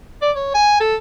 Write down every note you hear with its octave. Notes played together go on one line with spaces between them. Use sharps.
D5
C#5
G#5
A4